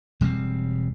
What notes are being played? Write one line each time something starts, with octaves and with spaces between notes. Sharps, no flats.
E1 G3 A3 C4